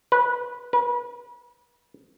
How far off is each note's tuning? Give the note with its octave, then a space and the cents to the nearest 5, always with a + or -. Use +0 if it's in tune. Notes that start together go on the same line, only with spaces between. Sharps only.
B4 -20
B4 -35